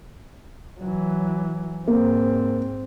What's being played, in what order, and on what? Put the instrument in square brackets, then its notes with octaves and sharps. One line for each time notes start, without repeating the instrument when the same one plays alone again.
[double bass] E3 F#3
[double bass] G#2 C4 [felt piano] A#3